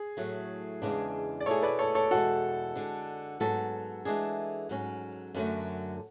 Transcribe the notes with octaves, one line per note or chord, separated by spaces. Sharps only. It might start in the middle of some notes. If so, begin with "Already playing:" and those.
Already playing: G#4
A2 F#3 A3
E2 C#3 G#3 B3 D4
D5
B2 A3 E4 G#4 A4 C#5
B4 D5
A4 C#5
A4 C#5
E2 B2 G#3 F#4 A4
D3 G#3 D4
G#2 F#3 B3 F#4 A4
E3 G#3 D4 G#4
G#2 F#3 C#4
F#2 D3 F#3 A3